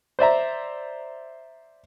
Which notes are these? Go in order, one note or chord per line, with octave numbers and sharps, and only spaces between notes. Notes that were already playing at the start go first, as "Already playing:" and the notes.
C5 D5 E5 A#5